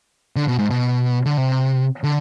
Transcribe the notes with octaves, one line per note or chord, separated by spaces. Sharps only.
D3
B2
G#2
B2
D3
C3
D3